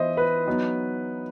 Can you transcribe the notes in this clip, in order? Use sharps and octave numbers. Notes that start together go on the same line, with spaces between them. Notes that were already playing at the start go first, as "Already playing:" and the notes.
Already playing: E3 B3 E4 C5 D#5 E5
B4
F#3 B3 D#4